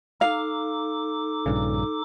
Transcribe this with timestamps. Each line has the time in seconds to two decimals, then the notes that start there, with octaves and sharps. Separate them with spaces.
0.21 D#4 A4 F5 D6
1.46 A#1 G2 C#3